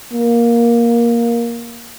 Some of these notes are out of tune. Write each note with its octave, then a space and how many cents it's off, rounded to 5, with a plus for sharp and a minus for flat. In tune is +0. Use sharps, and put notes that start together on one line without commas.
A#3 +10